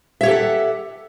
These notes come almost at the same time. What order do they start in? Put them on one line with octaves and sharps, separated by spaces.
E5 C#5 G4 A4 F#5